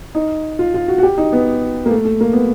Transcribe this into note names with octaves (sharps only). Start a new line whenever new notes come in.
D#4
F4
F4
F#4
F#4
G4
D#4
B3
A#3
A3
A3
A#3
B3